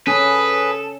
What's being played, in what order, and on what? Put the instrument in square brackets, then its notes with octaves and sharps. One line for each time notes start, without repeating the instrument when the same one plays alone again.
[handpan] C#4 [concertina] G#4 [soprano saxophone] A4 [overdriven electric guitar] B4